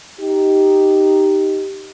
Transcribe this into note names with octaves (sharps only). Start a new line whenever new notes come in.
D#4 G4